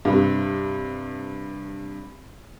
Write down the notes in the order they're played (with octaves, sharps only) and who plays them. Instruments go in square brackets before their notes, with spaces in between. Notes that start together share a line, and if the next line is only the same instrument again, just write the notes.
[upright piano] G2 C3